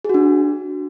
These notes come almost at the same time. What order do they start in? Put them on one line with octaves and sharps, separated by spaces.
G#4 F#4 D4